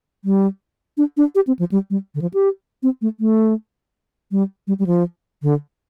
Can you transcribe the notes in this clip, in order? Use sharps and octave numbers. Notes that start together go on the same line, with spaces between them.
G3
D4
D4
G4
C4
F3
G3
G3
D3
F3
G4
C4
A3
A3
G3
G3
G3
F3
D3